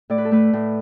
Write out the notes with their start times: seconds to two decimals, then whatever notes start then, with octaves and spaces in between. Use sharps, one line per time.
0.10 A2 D5
0.18 B4
0.25 A4
0.31 A3 B4
0.53 A2